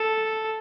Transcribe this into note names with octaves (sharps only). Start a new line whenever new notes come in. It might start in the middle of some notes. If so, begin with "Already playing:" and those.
Already playing: A4